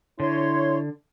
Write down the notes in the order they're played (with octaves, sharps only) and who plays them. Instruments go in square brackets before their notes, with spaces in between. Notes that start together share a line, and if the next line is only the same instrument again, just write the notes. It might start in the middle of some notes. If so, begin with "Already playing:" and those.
[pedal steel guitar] D3 [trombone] E4 [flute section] C#5 C6